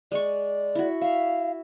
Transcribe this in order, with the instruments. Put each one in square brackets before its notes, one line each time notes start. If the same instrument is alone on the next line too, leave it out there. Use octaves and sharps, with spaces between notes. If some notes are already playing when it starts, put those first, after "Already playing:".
[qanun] G#3 C#6 [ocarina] D5
[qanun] E4 F#4
[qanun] E5 [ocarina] F5